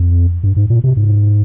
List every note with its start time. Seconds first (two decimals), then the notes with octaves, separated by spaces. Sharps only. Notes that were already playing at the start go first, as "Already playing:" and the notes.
Already playing: F2
0.43 G2
0.56 G#2
0.70 A#2
0.84 C3
0.97 G#2